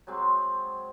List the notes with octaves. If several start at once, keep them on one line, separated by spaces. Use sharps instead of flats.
F#3 G#3 C4